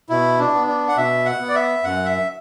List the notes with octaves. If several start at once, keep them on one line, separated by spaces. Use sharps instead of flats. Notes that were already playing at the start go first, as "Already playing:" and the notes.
B2 E4
D4
B3
D4
F#5
B2 E5
F#5
B3
D5
E5
F#2 F#5
E5